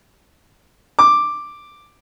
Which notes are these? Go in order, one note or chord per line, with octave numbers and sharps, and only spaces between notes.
D6